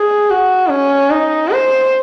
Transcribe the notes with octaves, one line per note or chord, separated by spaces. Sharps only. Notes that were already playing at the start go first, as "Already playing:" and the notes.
Already playing: G#4
F#4
C#4
D#4
C5